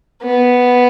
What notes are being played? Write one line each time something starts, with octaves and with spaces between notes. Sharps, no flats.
B3